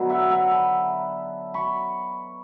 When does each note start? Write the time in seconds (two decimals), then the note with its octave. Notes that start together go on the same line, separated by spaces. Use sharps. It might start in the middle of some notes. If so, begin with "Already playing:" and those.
Already playing: D3 F#3 B3 D#4
0.10 E5 F#5
0.31 E5 F#5
0.51 A5 B5
1.54 B5 C#6